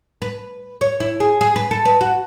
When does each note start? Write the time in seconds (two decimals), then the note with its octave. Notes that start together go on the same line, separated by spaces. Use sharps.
0.22 B4
0.81 C#5
1.00 E4
1.20 G#4
1.41 G#4
1.56 B4
1.71 A4
1.85 B4
2.01 F#4